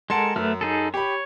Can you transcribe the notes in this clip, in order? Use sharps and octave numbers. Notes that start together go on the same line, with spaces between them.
G#3 A4 A#4 F#5 A5 C6
F#2 A3 B4 F6
D#4 G#4 A4
G4 C#5 B5